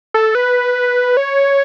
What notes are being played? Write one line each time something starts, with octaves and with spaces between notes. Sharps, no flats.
A4
B4
C#5